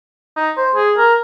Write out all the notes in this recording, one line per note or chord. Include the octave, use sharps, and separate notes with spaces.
D#4
C5
G#4
A#4